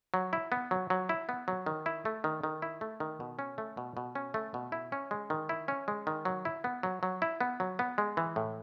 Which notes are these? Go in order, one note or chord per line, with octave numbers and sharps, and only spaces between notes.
F#3
E4
B3
F#3
F#3
E4
B3
F#3
D#3
E4
A3
D#3
D#3
E4
A3
D#3
B2
C#4
A3
B2
B2
C#4
A3
B2
E4
C#4
G#3
D#3
E4
C#4
G#3
D#3
F#3
E4
B3
F#3
F#3
E4
B3
F#3
B3
G#3
E3
A2